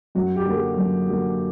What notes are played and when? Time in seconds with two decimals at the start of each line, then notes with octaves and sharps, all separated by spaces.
0.15 F#2 F#4
0.36 G4
0.45 D3 F#3 A#3
0.56 G#4
0.77 F#2
1.07 D3 F#3 A#3